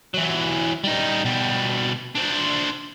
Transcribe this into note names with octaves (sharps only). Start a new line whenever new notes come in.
E3 F#3
G3 D#4
B2 G3
D4 C5